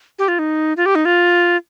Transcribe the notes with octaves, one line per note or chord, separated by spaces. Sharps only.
G4
F4
D#4
F4
G4
D#4
F4